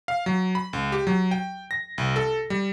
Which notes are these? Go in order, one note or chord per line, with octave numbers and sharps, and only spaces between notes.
F5
F#3
B5
C#2
G4
F#3
G5
A#6
C2
A4
G3